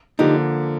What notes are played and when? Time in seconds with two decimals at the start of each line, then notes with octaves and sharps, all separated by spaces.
0.19 D3 F3 A#3 D#4 G4